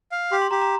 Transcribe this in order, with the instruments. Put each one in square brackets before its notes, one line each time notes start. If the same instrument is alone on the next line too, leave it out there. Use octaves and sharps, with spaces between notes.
[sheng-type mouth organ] F5
[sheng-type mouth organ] G4 [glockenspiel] C6
[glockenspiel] C6
[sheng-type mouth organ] G4 [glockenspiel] A#5
[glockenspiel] A#5